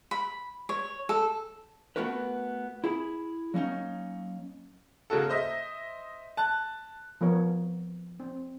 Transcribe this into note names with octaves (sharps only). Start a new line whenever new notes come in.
B5
C#5
A4
A3 B3 C#4 F#4 A#4 B4
E4 G#4
F#3 A#3 C#4 D#4
C#3 A#3 F#4 A4
C5 D#5 E5
A5 F#6
F3 B3 A#4 C#5
C4